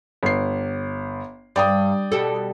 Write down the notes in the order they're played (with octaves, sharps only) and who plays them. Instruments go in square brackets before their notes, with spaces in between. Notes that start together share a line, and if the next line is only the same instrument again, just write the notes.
[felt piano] G1 C7
[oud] G2 [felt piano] D5 G5 D#6
[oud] B2 G3 A4